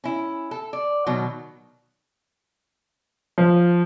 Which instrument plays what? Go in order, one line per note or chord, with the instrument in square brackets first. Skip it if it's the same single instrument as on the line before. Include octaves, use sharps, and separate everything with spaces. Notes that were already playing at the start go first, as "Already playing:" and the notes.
[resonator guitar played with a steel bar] C#4 E4
A4
D5
B2 D#3 F#3
[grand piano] F3